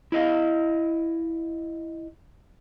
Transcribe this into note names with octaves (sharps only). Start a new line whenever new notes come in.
E4 D#5 F5